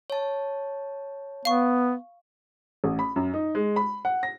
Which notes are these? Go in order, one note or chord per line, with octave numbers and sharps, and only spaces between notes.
C#5 A5
B3 F5 C#6
A1
B5
F#2
D#4
G#3
B5
F#5
A#6